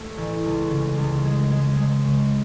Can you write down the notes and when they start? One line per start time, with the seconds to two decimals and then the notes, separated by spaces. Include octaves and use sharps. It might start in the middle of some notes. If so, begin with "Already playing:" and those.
Already playing: A3
0.18 A1
0.45 C#2
0.70 C#3
0.97 C#2
1.25 G#3
1.51 G#3
1.77 G#3
2.05 C#3